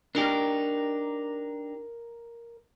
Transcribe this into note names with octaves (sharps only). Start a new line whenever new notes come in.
D4 D#4 G4 A#4